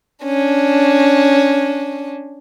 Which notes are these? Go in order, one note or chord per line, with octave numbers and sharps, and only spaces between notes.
C#4 D4